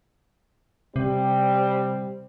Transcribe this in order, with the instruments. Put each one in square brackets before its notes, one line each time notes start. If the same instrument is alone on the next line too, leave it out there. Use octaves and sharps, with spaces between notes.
[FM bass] C3 [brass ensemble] G3 C4